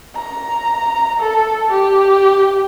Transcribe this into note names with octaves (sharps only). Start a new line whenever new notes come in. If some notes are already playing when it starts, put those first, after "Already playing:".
A#5
A4
G4